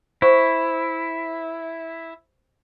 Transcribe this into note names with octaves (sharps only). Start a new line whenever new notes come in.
E4 C5 F#5 C#6